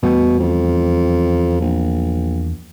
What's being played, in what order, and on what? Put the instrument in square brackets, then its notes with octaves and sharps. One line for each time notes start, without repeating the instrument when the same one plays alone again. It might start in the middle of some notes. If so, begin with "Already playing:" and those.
[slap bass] E2 G3 A3 [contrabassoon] B2
[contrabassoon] F2
A#1